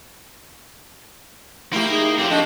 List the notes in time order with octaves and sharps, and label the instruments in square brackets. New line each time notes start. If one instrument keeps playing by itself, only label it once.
[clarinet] A3 [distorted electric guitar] A#3 A#4 [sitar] E4 G4
[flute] D#4 [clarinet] G#4
[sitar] A2 A#3 [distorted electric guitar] F3 C4 [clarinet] G4 [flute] D6
[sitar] A3 A#3 [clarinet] D4 [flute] D#5